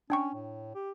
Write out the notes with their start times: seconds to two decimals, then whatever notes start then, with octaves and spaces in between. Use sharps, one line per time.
0.10 C#4 D4 G5 C#6
0.34 A2
0.75 G4